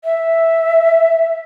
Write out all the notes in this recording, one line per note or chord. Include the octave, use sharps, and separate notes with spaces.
E5